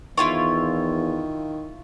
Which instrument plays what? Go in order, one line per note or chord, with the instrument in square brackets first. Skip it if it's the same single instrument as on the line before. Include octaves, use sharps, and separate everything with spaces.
[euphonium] E2 [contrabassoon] D#3 [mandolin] E4 F4 C#5